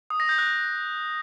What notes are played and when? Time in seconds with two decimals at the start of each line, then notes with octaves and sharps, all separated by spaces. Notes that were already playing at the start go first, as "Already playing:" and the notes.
0.10 D#6
0.20 A#6
0.29 G6
0.38 F#6